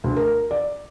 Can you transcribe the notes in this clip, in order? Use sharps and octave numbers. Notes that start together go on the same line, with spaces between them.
D2
A#4
D5